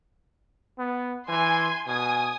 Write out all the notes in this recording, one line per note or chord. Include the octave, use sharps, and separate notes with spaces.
B3
E3 G#5 C6
B2 G#5 D#6